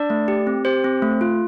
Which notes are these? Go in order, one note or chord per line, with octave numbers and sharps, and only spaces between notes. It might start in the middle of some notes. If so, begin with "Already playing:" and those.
Already playing: D4 D5
A3
G4
C4
G4 C5
C4
A3
F4